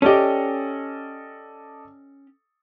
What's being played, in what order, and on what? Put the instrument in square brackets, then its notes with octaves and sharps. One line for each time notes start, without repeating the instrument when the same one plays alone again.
[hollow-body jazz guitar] C#4 G4 [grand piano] A4 D5 D#5